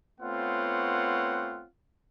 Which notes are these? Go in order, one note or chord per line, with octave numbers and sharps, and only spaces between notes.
A3 B3 C4 F4 C#5 F#5